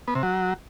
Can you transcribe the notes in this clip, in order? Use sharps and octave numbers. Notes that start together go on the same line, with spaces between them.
B3
C3
F#3